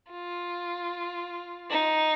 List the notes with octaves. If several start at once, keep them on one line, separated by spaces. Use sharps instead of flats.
F4
D#4